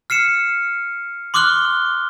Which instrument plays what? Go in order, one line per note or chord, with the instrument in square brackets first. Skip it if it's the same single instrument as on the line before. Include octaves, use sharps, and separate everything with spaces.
[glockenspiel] F6 C7 C#7 E7
C6 D6 D#6 F6 F#6 G7